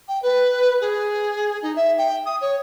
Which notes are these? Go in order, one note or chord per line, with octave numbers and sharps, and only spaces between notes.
G5
B4
G#4
D#4
E5
G5
D#6
C#5